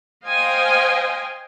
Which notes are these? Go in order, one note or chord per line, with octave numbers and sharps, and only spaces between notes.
C5 D#5 F5 G5 G#5